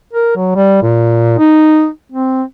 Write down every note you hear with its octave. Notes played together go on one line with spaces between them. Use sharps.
A#4
F#3
G3
A#2
D#4
C4